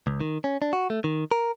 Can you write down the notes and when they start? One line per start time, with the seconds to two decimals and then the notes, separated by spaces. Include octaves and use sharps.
0.07 C#2
0.21 D#3
0.44 C#4
0.62 D4
0.73 F#4
0.90 A3
1.04 D#3
1.31 A#4